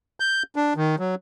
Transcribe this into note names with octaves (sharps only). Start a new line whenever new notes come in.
G6
D4
D#3
F#3